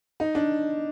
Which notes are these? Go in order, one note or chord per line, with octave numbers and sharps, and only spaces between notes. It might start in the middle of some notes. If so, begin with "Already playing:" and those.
D#4
D4